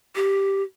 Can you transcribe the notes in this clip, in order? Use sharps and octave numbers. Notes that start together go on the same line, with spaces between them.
G4